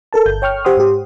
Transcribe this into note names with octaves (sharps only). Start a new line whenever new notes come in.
A4 A#4 A5
G1 G6
C#5 G5 C#6 F6
G4 C5 F#5 G5 C6 D#6
G#2 G4